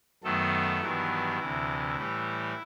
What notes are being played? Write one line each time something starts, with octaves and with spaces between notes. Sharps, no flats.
F#2 D#3 F#3 A3 B3 A4
G2 D#3 E3 F#3 B3 E4
D2 C3 E3
A2 E3 G3